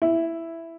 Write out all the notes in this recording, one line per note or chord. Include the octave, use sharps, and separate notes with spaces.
E4